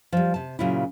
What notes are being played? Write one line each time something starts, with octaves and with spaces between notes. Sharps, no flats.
F3 G3
C3 A5
A#2 C#3 F#3 E4